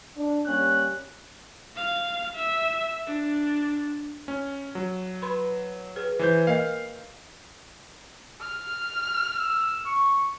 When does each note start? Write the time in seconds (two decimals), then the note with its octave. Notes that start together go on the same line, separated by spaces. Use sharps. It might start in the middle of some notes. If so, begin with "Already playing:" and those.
0.16 D4
0.47 G3 A#3 C#4 F#6
1.76 F5
2.35 E5
3.07 D4
4.28 C#4
4.75 F#3
5.22 B4 B5 C6
5.96 G#4 B4
6.19 E3 B4 C5 G6
6.47 A#3 A#4 D#5 F5
8.40 F6
9.40 E6
9.86 C#6